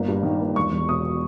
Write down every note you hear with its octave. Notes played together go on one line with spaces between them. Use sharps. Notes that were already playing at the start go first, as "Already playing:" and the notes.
Already playing: G1 A#3
G2
D#3
A#3
E1 C#6
E2
B2 D#6